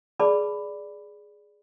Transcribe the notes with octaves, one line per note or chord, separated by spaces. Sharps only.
G#4 B4 D5 A5 B5 D6